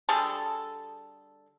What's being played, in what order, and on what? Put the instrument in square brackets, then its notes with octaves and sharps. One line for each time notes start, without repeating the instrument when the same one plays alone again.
[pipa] D3 G3 G#4 A4